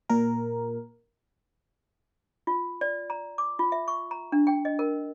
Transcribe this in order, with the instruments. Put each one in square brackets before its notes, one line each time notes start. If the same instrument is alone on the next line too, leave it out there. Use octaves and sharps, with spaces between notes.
[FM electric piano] A#2 A#4
[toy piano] F4
D5
A#5
D6
F4
E5
C#6
A#5
D4
G5
D#5
A#4